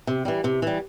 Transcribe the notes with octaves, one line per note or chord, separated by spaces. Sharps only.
C3
E3 G3
C3
E3 G3